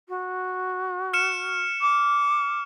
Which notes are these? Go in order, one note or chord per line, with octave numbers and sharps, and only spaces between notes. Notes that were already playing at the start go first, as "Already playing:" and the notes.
F#4
F6 C#7 E7
D6